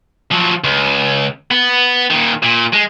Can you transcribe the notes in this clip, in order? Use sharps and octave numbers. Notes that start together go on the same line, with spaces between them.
F3 F#3
C#2
B3
A#2 D#3
A#2
G#3